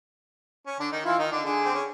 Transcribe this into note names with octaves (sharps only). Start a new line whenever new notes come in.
C#4
D3 D4
D#3 D#4
E3 E4 F4
D#3 D#4
D3 D4
D3 D4 G#4
C4
C#4